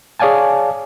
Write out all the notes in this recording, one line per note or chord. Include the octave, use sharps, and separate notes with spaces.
G#4 C#5 D5 F5 G#5 A5